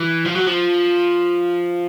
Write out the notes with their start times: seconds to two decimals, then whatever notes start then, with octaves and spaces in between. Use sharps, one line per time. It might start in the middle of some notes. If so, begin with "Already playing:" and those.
Already playing: E3
0.26 F3
0.36 F#3
0.47 F3